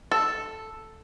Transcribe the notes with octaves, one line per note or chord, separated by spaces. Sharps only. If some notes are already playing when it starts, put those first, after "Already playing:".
A4